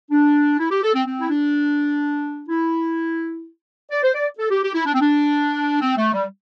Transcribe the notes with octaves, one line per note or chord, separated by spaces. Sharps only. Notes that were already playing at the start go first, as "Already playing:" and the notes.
D4
E4
G4
A4
C4
C4
E4
D4
E4
D5
C5
D5
A4
G4
G4
E4
D4
C4
D4
C4
A3
G3